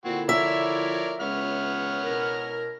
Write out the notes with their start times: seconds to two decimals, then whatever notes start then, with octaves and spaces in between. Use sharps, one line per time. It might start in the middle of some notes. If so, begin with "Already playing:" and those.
0.05 A#2 D3 C4 E4 F#4
0.29 F3 A#4 C#5 D5 E5
1.21 C#2 B3 C#5 F6
2.03 B2 E4 A#4